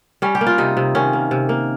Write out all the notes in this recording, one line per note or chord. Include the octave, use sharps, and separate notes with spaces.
G3 C#4
G4
A#3
F4
C3 D#4
C3
D#3 C#4
A#3
C3
A#3